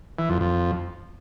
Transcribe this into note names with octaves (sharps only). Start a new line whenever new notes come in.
E3
F2
F2